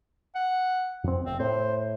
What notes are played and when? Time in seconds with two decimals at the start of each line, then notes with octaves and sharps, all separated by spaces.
0.35 F#5
1.04 F2 C4
1.26 F1 C4
1.40 A2 C5